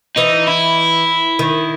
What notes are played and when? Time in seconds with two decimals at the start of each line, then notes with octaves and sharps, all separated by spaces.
0.17 E3 D#4
0.47 E4
1.39 D#3